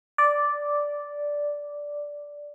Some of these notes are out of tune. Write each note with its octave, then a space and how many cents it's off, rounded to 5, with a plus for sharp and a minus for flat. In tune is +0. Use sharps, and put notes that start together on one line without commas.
D5 -5